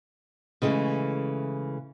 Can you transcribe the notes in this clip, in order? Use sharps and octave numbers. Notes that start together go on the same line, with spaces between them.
C#3 E3 G#3 A3